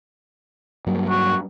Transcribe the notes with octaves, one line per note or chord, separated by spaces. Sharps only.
G2 F#3 A#3
F#4